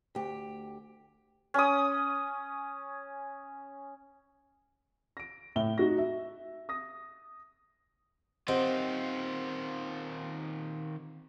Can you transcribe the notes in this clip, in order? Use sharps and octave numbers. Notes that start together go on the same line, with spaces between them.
D2 G4
C#4 D#6
A#6 D7
A2 E5 G7
D#4 F#4 A#6
E5
D#6 A#6
D#3 C4 F4 G4 D#5 F#5